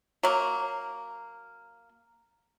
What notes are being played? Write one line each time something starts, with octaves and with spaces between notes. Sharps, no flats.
F#3 A#3